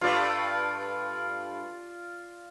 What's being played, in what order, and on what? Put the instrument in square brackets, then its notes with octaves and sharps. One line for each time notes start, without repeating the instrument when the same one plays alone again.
[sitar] G2 A3 [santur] F4 D5